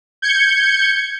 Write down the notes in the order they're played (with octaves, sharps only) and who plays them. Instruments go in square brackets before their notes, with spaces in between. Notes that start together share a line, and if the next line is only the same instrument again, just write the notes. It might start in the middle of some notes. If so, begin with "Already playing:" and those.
[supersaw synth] G6 G#6 C#7